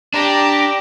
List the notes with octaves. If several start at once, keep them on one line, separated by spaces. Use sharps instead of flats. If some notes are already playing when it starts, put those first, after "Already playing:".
D4 G4 A#5